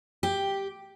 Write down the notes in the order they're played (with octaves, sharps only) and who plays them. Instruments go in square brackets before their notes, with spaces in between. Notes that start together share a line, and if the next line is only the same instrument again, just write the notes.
[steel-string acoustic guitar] G4